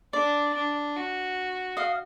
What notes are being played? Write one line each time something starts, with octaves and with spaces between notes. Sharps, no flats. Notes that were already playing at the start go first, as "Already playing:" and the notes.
D4 D5
D4
F#4
D#5 F5